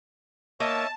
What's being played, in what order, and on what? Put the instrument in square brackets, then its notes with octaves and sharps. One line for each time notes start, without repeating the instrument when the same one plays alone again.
[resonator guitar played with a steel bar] A#3 [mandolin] D#4 [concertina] C#5 E5 [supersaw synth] A5